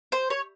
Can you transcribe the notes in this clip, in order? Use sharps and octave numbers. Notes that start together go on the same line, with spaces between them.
C5
C#5